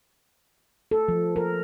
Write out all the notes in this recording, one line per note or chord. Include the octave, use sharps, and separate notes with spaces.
A4
F3
A#4